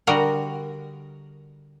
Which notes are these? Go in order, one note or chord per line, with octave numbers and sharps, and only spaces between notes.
D3 G3 F#4 A#4 D#5